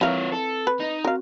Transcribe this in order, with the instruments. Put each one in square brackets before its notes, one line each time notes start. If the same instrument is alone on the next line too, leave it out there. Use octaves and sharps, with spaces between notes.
[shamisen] E3 A#4 F5 [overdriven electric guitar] F3 C#5 [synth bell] C4
[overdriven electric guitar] A4
[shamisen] B4
[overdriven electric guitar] D#4
[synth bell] C4 F#4 [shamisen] A#4 F5